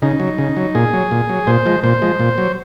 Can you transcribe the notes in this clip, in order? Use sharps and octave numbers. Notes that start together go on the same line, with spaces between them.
C#3 D#4
F#3
C#3
F#3
A#2 G#4
F#3
A#2
F#3
A#2 C5
F3 G#3
A#2 C5
F3 G#3
A#2
F#3